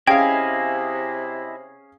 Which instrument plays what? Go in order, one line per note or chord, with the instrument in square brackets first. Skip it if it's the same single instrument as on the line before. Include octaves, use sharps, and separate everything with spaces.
[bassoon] C3 [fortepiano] C#4 G#4 F5 [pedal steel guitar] E4 D#5 G#5 [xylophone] G5